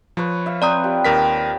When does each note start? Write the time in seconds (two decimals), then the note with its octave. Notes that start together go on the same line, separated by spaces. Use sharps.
0.17 F3 B4 C#5
0.46 E5 F5
0.62 C4 B4 D5 A#5 D#6
0.84 F4 G4 G5
1.05 D#2 A#4 B6